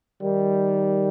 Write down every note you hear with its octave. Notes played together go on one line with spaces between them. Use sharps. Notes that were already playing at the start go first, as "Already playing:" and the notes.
D#3 G3